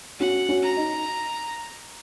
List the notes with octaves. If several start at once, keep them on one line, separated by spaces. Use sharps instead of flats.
C#4 F#4 F#5
C#4 F#4
A#5
D#4